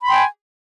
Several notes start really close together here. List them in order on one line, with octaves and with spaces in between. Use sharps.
B5 C6 G5 G#5